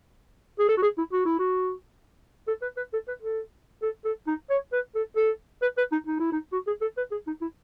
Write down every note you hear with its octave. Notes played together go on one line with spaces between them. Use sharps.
G#4
A4
F#4
G#4
E4
F#4
E4
F#4
A4
B4
B4
A4
B4
A4
A4
A4
D#4
C#5
B4
A4
A4
B4
B4
D#4
D#4
E4
D#4
F#4
G#4
A4
B4
G#4
D#4
E4